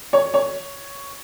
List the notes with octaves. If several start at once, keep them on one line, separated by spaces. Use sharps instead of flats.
C#5
C#5